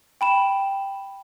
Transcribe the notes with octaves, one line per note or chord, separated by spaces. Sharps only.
G5 B5 E7